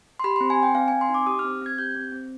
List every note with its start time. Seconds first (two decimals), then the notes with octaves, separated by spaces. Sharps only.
0.19 C6
0.24 G4 B5
0.36 C6
0.41 C4
0.50 G#5
0.58 C4 G5
0.75 C4 F5
0.88 G#5
0.92 C4
1.01 C6
1.10 D#4 D6
1.26 G4 D#6
1.39 F6
1.44 C4
1.61 C4 G#6
1.78 G4 G6
1.95 C4
2.12 C4